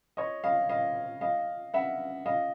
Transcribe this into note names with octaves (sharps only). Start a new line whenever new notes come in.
C#5 D#5
D#5 F5
D#5 F5
D#5 F5
E5 F#5
D#5 F5